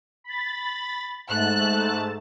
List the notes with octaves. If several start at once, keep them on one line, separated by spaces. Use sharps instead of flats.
B5 A6
G#2 A3 A5 F#6